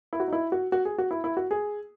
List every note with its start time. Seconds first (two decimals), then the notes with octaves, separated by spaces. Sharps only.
0.13 E4
0.20 F#4
0.28 D#4
0.33 E4
0.52 F#4
0.72 F#4
0.85 G#4
0.98 F#4
1.11 E4
1.24 E4
1.37 F#4
1.51 G#4